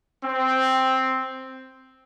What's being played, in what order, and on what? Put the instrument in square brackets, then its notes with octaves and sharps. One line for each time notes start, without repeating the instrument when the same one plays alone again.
[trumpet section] C4